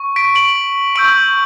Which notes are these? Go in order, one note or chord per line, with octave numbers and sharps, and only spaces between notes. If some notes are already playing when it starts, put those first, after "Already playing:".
Already playing: C#6
B6 D7
D7 F#7
C#6 E6 G6 D7 F#7